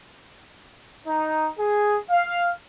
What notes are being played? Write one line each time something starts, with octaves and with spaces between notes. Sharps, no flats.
D#4
G#4
F5